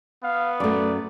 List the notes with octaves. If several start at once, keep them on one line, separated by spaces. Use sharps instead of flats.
B3 F5
F#2 A3 D5